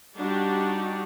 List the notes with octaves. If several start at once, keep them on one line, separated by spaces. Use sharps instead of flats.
G3 D4 D#4 F#4 G4